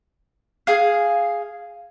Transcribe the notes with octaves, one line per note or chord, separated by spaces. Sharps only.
G#4 F5